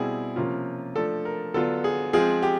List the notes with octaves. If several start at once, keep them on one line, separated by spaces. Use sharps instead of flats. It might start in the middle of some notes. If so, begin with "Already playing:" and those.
Already playing: B2 G3 C4 E4 G#4
C3 F3 A#3 C#4 F4
F3 A3 D4 A4
A#4
D3 F#3 B3 D4 F4 A4
G#4
F3 G#3 C4 F4 G#4
G4